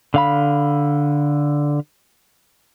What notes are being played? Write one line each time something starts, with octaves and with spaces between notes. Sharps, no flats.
D3 F5 B5